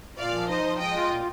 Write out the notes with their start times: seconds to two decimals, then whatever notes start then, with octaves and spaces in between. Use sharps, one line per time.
0.18 A#2 D5 F5
0.34 F3
0.49 D#4 C5 D#5
0.64 F3
0.79 G#3 D#5 G5
0.96 F4
1.10 A#2